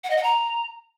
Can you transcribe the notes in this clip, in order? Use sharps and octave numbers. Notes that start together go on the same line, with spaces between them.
F#5
D#5
F#5
A#5